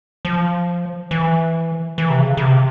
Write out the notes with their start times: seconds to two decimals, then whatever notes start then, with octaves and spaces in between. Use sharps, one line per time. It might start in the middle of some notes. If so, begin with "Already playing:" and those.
0.25 F3
1.11 E3
1.98 E3
2.10 C3
2.20 C#3
2.37 C#3
2.42 C3